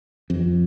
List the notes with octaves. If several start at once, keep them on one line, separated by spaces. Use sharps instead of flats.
F2